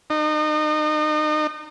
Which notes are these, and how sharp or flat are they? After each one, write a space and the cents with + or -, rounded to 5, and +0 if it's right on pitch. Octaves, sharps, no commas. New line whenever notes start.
D#4 -35